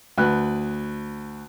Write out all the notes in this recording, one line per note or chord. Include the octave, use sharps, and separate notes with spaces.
D2 B4 F#6